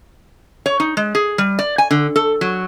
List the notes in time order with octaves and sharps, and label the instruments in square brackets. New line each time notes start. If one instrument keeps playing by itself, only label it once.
[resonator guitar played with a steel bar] C#5
D#4
G#3
G#4
G3
D5
G#5
D3
A4
F#3